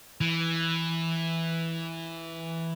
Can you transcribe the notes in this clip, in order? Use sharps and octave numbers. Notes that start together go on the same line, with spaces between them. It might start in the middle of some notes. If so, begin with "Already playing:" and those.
E3